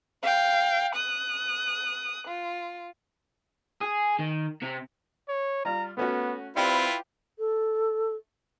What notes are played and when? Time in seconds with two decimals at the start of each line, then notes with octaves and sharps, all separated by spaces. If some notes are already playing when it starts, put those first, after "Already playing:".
0.23 F5 G5
0.95 D#6 F#6
2.27 F4
3.81 G#4
4.19 D#3
4.62 C3
5.28 C#5
5.65 G3 F4 A#5
5.97 A3 B3 C#4 F#4
6.56 C4 E4 F4 G4 B4 D5 B5
7.39 A4